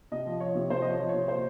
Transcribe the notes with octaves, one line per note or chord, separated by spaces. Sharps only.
C3 D#5
F3
F3 C#5
C3
C3 C5
D#5
F3
C#5
F3
C#5
C3
A#2 C5